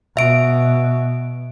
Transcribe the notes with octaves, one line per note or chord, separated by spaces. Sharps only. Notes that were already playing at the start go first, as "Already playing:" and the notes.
B2 E5 D7